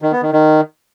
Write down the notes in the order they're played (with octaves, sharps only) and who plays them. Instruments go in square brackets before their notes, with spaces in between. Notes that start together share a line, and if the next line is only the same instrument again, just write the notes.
[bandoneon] D#3
B3
D#3
D#3